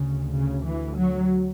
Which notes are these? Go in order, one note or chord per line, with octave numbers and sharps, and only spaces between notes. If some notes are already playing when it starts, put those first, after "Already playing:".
Already playing: D2 C#3
C#3
E3
F#3